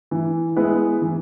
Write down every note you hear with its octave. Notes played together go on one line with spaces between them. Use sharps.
E3
G#3 B3 E4 B4
E3